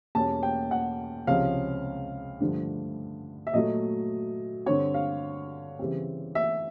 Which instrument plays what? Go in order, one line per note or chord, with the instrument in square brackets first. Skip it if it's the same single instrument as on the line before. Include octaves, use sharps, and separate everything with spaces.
[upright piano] E2 B2 G3 A#3 C#4 A5
G5
F#5
C#2 C3 F3 G#3 C#4 F5
G2 D3 F3 A3 D4
E5
A#2 F#3 A3 D#5
G2 D3 G3 C4 C#5
F5
C#3 E3 G3 C4
E5